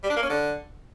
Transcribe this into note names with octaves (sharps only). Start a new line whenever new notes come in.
G3
D4
A#3
C#4
D3